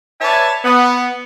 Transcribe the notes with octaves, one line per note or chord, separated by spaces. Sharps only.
B4 C#5 D5 E5 G#5 A5
B3